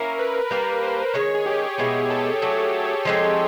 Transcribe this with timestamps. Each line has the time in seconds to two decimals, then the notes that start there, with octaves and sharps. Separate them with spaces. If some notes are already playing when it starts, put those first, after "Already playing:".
Already playing: A#3 C#4 E4 A#4
0.19 B4
0.51 G3 A#3 D4 A#4
0.83 C5
1.14 D#3 G#3 C#4 C#5
1.35 G#4
1.46 G4
1.70 G4
1.78 B2 G#3 B3 E4 G#4
2.10 A4
2.42 F#3 A3 D4
3.05 F3 G#3 C4 D#4